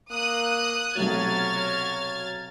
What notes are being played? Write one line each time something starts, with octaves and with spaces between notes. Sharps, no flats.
A#3 D#6 F#6
B1 C3 F#3 A3 F6 G#6 A6